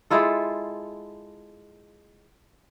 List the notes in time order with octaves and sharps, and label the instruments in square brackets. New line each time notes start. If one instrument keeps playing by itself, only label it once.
[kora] G#3 E4 F4 A4